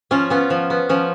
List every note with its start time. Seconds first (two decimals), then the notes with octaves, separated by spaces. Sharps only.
0.11 F3 C#4 F4
0.30 B3 C#4 F4
0.50 F3
0.70 B3
0.89 F3 C#4